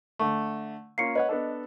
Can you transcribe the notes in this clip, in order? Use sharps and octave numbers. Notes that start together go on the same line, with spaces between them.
D3 A3
A#3 C#4 F4 C7 C#7
B4 C#5 D#5 F#5
B3 D4 A4